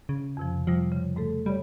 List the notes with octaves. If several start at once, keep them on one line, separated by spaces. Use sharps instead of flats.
C#3
F2 C3 F3
C3 F3 G3
C#3
G#2 A3 A4
G3 C#5 D5 B5